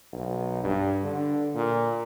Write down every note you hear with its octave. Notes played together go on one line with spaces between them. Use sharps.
B1
G2
D3
A#2